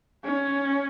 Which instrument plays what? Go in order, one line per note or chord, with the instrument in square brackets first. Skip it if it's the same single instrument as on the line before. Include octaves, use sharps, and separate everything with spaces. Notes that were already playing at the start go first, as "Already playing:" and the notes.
[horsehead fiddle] C#4